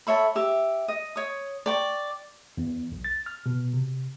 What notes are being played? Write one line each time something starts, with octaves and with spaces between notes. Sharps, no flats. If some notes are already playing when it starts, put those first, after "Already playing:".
A4 C#5 E5 B5
G4 E5
D#5
C#5 D#6
D5 G5 C#6
E2
B1
A6
F6
B2
C3